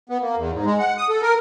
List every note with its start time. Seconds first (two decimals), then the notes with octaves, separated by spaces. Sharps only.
0.09 B3
0.22 A#3
0.36 E2
0.52 G#2
0.66 G#3
0.79 F#5
0.98 D#6
1.09 A4
1.22 A#4